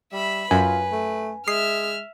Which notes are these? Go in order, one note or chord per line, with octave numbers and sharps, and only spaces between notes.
G3 E5 B5
F#2 F4 B4 G#5
A3
G#3 E5 D#6 F6 C7